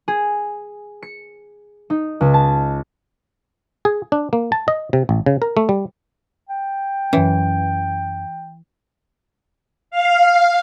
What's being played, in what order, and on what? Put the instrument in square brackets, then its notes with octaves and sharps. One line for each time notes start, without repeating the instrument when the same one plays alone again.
[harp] G#4
C#7
D#4
C#2
A5
[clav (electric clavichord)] G#4
D4
A#3
A5
D#5
C3
A1
C#3
A#4
A3
G3
[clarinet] G5
[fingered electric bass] F#2 C#4 [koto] E3
[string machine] F5